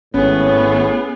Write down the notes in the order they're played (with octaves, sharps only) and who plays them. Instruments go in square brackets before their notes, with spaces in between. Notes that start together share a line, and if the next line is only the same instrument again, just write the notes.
[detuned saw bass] G#1 [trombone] A2 [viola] B3 G#4 [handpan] C#4